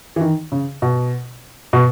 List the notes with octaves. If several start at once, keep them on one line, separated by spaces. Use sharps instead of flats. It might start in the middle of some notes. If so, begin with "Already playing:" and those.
E3
D#3
C#3
B2
B2